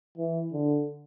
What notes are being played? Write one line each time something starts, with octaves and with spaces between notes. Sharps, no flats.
E3
D3